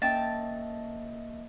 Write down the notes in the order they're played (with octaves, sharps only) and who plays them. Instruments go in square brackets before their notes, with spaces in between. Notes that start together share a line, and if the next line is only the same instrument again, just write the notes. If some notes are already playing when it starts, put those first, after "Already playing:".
[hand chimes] A#3 D#5 E5 [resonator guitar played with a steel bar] C#4 G5 [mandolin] A5